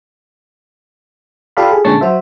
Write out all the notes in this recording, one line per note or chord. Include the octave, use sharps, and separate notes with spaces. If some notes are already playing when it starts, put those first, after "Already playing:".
F4 G4 A4 D5 F5 B5
G#4
A#2 D3 G#3 C#4 A5 C#6
F#3 F#4 C5 E5